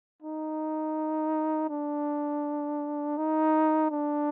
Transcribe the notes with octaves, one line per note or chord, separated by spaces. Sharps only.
D#4
D4
D#4
D4